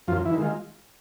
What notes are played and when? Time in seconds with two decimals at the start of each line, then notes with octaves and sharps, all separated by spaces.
0.07 F#2 F3 F4
0.25 E3 E4
0.33 D#3
0.38 G#3 F4